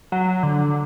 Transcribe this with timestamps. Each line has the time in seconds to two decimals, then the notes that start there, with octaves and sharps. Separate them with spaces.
0.12 F#3
0.43 D3